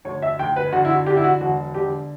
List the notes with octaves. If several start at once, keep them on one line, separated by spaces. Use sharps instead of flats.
D2 C#5
E5
D2 G5
B4
D3 F#4
E4
F#4
D3 G4
E4
F#4
E1 F#4
D3 G4